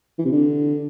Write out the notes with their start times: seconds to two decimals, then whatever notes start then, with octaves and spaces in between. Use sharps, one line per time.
0.19 E3
0.25 C3
0.32 D3